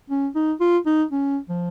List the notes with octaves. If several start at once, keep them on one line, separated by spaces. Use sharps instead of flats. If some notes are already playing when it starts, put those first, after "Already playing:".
C#4
D#4
F4
D#4
C#4
F3